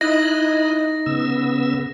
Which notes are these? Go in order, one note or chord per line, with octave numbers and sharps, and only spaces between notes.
D#4 E4 D#5 F#6 A#6
C#3 B3 E6